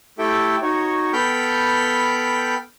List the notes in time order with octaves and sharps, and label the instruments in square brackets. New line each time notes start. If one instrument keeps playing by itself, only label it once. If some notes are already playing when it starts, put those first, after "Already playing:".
[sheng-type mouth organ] A3 E4 G4 A4 E5 G5
D#4 F#4 C#5
B3 A4 G5 B5 F6 G6